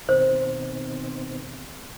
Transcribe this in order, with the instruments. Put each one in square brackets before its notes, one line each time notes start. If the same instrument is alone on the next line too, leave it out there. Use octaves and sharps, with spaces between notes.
[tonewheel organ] B2 D#3 C4 [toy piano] C5